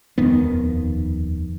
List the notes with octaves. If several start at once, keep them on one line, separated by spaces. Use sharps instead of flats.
D#1 F2 D#3 B3